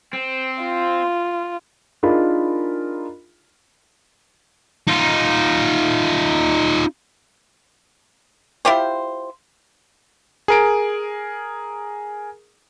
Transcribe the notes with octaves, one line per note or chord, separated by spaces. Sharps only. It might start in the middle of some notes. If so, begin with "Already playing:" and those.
C4
F4
D4 D#4 F4 G#4 A#4 B5
D#4 F4
E4 F4 G4 C5
G#4 A#4 D7